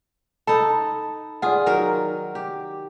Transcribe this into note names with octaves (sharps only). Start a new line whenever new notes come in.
D#4 A4 A5 B5
F4 G#4 D5 F#5
D#3 F#3 A#4
G4